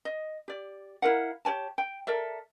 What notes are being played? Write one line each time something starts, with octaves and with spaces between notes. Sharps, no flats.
D#5
G4 D5
E4 A#4 F5 F#5
G4 C#5 G#5 A5
G5
A4 A#4 D5 E5